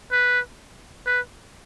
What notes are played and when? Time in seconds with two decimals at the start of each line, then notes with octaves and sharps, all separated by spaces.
0.12 B4
1.06 B4